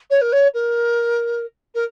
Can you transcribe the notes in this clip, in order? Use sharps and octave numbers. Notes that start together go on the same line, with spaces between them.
C#5
A#4
C#5
A#4
A#4